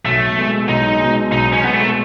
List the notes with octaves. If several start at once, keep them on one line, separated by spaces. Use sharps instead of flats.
B1 A3
B2 G#3
B1 D#4
B2 G#3
B1 D#4
C#4
B2 G#3 B3
A3